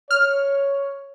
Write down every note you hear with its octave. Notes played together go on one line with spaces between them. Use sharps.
C#5 F6